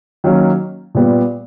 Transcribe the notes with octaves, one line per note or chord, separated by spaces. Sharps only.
D#3 F#3 A#3 C#4
A#2 G3 B3